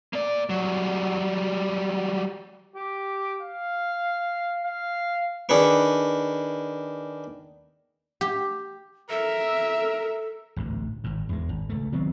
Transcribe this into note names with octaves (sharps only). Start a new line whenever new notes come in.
A#3 D5
F#3 G3
G4
F5
F5
D#3 D4 G#4 B4 C#6
G4
A4 A#4 E5
A1 D2 G#2
G#1 G#2
E2 G#3
G#1
C#2 A3
D#3 F#3 B3 C4